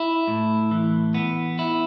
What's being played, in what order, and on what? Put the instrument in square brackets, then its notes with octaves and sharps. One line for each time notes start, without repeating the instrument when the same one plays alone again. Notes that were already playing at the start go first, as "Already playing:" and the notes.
Already playing: [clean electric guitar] E4
A2
E3
B3
E4